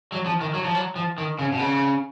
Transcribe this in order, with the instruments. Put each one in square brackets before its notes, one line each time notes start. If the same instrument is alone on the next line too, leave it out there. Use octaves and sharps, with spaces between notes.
[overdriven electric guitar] F#3
F3
D#3
F#3
F3
F#3
F3
D#3
C#3
B2
C#3